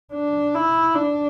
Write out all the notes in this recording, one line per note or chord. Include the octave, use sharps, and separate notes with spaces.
D4
E4
D4